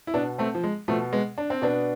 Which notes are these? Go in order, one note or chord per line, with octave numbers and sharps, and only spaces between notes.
E4
B2 B3 D4
A3 C4
F3
G#3
B2 F3 A3
G#3 B3
D4
C4
B2 B3 D4